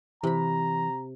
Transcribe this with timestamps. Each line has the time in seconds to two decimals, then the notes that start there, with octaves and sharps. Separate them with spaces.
0.23 C3 E3 A#5 B5